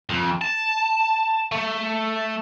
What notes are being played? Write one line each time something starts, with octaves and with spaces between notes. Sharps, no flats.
F2
A5
A3